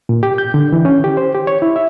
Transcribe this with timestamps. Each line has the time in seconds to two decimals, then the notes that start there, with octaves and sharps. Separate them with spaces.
0.09 A#2
0.23 G4
0.38 G6
0.54 D3
0.72 E3
0.85 C#4
1.04 G4
1.17 C5
1.35 G4
1.47 C#5
1.62 E4
1.76 E5